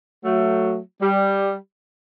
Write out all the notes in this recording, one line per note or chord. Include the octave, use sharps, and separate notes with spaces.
F#3 A3
G3